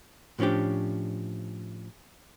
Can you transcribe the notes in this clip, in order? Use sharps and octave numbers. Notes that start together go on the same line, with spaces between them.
A2 F3 C#4 D4 G4